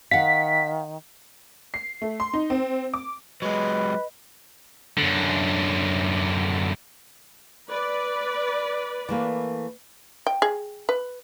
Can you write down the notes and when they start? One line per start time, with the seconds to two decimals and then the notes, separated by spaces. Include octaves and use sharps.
0.11 D#3 F5 F#5 B6
1.74 C7
2.02 A3
2.20 C6
2.34 D#4
2.50 C4
2.94 D6
3.42 F#3 G#3 B4 D#5
4.98 F#2 D3
7.69 B4 D5
9.09 E3 A3 A#3
10.27 G5
10.42 G#4
10.89 B4